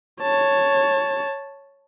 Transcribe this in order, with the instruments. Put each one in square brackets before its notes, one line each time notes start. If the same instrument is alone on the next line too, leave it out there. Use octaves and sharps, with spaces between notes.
[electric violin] C#5 A5